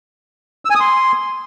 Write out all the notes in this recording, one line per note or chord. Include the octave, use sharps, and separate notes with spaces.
E6
G#5
D#6
C6